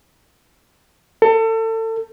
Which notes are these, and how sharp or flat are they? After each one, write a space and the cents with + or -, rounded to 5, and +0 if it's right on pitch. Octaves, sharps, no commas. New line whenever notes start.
A4 +30